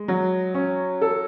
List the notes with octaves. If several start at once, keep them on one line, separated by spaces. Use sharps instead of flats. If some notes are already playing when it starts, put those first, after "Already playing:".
Already playing: G#3
F#3
C#4
A4